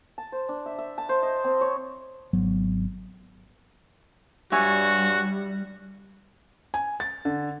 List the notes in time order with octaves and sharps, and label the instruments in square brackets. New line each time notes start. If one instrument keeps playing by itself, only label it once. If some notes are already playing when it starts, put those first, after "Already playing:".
[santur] A5
C5
D4
E5
E5
A5
C5
D#5
C4
C#5
[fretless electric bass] G#1 F#3 B3
[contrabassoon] G2 [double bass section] G3 [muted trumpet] F#4 [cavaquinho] C#5 E5 G#5
[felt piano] G#5
A6
D3